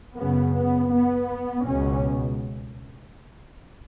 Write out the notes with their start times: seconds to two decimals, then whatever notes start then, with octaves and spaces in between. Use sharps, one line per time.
0.16 F#2 C#3 B3
0.54 B3
0.91 B3
1.66 C#2 B2 C#4